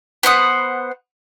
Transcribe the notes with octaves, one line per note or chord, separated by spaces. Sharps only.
B3 C5 F#5 D#6